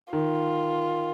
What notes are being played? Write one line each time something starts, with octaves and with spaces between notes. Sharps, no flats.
D#3 F4